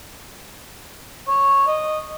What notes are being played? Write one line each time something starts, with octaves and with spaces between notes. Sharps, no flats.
C#5
D#5